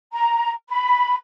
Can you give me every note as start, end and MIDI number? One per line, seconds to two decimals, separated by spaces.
0.13 0.52 82
0.70 1.14 83